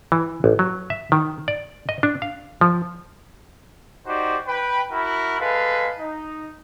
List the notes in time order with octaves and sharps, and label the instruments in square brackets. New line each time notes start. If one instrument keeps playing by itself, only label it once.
[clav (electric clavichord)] E3
A1
F#3
E5
D#3
D5
D#5
D4
F5
F3
[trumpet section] D#4 F#4 G4 C5 D5
B4 G5
E4 F#4 A#4 B5
G#3 A4 B4 F5
D#4